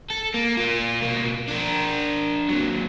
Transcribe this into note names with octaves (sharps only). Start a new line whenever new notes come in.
A4
A#3
A#3 F4
B2 A#3
D4 A#4
D#2 F#3